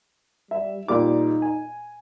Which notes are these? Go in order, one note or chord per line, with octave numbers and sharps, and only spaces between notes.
G3 E5
A#2 G3 D#4 D6
G#5